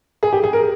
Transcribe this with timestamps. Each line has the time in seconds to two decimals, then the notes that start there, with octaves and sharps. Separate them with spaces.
0.23 G#4
0.33 G4
0.44 G#4
0.53 A#4